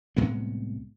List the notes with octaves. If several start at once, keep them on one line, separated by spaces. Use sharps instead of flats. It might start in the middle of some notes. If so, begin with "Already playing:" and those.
C2 A2 G#3 B3